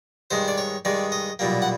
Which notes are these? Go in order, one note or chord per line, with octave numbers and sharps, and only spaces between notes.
G2 D#3 G#3 C5
D5
C#5
G2 D#3 G#3 D5
D#5
B1 A#2 G3 A#3
F#5